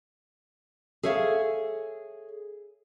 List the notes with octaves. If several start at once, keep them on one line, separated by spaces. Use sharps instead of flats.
G#4 A4 C#5 E5 F5